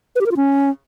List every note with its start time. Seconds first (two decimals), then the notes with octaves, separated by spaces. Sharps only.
0.16 B4
0.21 G4
0.26 A#4
0.31 F4
0.37 C#4